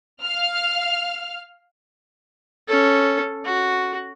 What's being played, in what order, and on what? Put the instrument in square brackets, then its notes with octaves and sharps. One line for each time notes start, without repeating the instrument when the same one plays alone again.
[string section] F5 F6
[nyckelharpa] C#4 A4
F#4